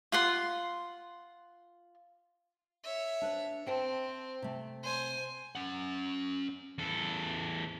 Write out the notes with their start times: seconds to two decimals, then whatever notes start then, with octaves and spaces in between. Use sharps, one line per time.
0.12 F4 F#5 C6
2.84 C#5 E5
3.22 D4 B4
3.67 C4 C5 G5 A5
4.42 C3 A3
4.83 C5 G#5
5.55 C#4 F#5
6.78 E2 A4